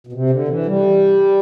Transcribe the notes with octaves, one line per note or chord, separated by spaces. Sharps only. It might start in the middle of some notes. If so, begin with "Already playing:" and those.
B2
C3
D3
E3
G3